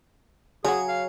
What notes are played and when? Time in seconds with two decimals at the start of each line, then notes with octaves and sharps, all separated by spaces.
0.65 C#3 F#3 F#4 G#4 C#5 G#5
0.89 F5